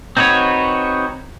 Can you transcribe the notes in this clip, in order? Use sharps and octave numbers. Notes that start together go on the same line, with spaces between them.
C4 D#4 F#4 B4 C#5